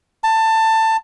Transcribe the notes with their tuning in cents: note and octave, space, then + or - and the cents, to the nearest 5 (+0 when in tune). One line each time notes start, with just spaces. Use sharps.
A5 +20